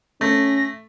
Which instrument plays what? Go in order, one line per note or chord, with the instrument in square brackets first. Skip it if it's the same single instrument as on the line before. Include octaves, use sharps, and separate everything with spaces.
[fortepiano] A3 [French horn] C#4 [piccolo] A#6